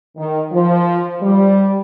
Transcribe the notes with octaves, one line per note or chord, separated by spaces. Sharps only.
D#3
F3
G3